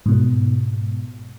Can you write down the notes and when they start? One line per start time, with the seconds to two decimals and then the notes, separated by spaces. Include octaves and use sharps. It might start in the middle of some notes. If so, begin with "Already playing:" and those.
0.06 G#2 B2